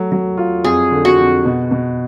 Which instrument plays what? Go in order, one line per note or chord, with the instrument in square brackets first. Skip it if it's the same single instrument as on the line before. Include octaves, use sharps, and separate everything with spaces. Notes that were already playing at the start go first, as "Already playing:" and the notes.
Already playing: [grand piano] F#3 A3
F#3
F4
[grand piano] F2 [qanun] G#4
[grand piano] D3
[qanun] F#4
[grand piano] F2
B2
B2